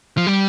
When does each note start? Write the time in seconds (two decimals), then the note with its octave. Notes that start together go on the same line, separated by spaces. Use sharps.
0.17 F3
0.27 G3